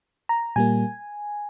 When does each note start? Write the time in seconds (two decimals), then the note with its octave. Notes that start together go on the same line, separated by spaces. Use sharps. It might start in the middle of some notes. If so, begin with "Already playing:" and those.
0.29 A#5
0.56 A#2 G3 A#3 G#5